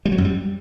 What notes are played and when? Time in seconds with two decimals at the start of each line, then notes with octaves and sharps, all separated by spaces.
0.05 G3
0.12 F#3
0.18 F#2
0.25 G3